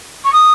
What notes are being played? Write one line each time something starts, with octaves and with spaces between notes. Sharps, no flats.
C#6
D#6